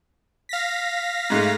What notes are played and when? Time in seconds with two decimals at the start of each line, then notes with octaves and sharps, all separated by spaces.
0.49 F5 A#6 B6
1.30 G#2 G#3 A3